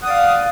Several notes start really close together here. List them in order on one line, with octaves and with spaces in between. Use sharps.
F#5 D#6 D5 F5